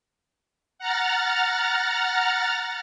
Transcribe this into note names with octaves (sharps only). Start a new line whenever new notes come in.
F#5 A#5 F6 A6